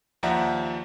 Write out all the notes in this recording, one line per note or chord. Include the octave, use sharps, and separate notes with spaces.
D#2 F3 D5 E5 F#5 A#5